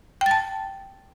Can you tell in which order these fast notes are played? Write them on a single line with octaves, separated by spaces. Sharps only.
G5 A6 A5